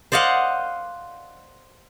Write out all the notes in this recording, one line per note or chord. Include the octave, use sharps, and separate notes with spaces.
C5 D5 D#5 F5 F#5